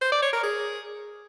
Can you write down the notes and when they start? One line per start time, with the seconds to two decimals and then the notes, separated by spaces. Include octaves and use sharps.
0.01 C5
0.12 D5
0.22 C#5
0.33 A#4
0.43 G#4